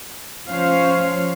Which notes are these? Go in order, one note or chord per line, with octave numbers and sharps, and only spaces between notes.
F3 C#4 C5 C#5 F5